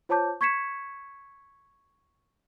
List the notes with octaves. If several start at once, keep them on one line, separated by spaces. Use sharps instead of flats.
F4 C5 C#5 A5 D6 G6
C#6 G#6 B6 C#7 E7